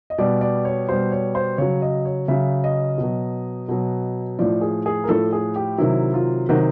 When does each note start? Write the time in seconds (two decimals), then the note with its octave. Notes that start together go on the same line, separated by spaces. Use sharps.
0.10 D#5
0.18 B2 G3 D5
0.41 D5
0.65 C#5
0.89 B2 G3 C5
1.12 C#5
1.35 C5
1.58 C#3 F#3 C#5
1.82 D#5
2.05 C#5
2.28 C#3 F#3 E5
2.64 D#5
2.98 B2
3.03 F#3
3.68 B2 F#3
4.39 A2 F3 D5
4.61 G#4
4.86 G#4
5.04 A#4
5.08 A2 F3 A4
5.33 G#4
5.56 G4
5.78 C3 D#3 F#3 E4
6.14 F4
6.49 C3 D#3 F#3 F#4